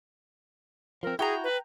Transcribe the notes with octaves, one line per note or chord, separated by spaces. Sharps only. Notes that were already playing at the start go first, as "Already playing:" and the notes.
F3 C4 A#4
E4 F#4 G#4 G5 A#5
B4